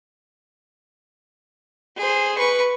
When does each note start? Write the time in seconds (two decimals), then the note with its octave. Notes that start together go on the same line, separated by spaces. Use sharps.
1.97 G#4 C5
2.38 B4 C#6